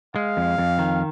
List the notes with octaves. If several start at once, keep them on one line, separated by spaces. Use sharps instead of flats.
G#3 F5
F2
F2
D#3